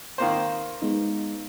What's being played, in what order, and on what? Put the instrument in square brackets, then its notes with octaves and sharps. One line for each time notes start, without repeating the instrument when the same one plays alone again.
[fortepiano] D#3 A#3 C5
[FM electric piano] G#3 B3 D#4